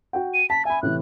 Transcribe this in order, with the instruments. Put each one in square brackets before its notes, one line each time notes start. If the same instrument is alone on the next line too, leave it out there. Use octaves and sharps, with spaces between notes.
[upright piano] F#4 G5
[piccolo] D#7
[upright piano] A5 [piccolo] B6
[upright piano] E5 B5 [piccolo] G#5
[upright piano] A2 C3 E3 [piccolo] F#6